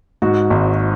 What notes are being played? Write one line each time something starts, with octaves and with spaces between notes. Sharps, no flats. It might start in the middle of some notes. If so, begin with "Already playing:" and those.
G#2 F#4
G#1